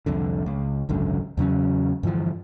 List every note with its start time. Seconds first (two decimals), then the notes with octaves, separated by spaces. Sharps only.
0.06 C2 F2 D3
0.46 C#2
0.89 G#1 C#2 F#2 D3
1.37 E2 C#3 F#3 C#4
2.03 G2 D3 E3 F3